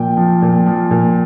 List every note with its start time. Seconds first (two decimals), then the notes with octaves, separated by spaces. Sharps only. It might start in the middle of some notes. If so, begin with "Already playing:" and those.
Already playing: A#2 F3 G5
0.17 F3
0.42 A#2
0.66 F3
0.91 A#2